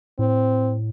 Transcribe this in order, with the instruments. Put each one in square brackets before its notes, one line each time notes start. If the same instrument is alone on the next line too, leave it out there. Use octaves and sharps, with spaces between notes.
[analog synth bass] A2 [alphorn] C4